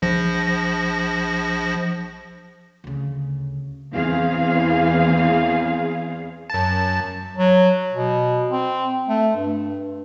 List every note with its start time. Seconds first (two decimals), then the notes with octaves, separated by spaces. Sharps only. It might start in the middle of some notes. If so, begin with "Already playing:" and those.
0.02 A#1 F3 A#6
2.84 D2 C#3
3.94 E2 E3 C4 G#4 F5
6.50 F#2 A5
7.37 F#3
7.92 B2
8.51 C4
9.09 A3
9.36 G2